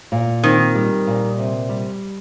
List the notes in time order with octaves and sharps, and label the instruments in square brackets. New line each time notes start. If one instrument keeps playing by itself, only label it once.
[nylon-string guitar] A#2
[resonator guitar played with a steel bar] D#3 [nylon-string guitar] C4
[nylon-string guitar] G3
A#2
C3
G3